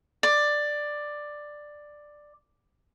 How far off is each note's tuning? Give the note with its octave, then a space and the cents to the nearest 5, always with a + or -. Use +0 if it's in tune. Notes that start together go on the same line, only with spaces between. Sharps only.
D5 +10